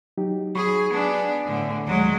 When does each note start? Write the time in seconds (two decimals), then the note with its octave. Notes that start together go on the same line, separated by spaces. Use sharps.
0.18 F#3 D#4 G4
0.55 F#3 G#4 B5 C#6
0.91 B3 D4 G#5 A5
1.46 A2 D3
1.87 D#2 F#3 G#3